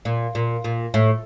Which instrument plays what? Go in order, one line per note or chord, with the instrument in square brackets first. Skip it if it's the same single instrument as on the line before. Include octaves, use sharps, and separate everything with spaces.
[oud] A#2
A#2
A#2
A2